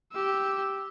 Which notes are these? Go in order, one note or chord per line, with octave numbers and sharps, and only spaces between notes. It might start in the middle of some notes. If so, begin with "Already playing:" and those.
G4 E6